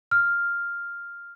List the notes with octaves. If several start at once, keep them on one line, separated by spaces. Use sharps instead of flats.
F6